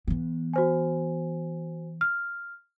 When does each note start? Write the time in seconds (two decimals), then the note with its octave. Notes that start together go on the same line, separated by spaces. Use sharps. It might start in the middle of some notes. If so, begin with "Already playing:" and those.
0.08 E3 B3
0.54 F#4 C5 G#5
2.01 F6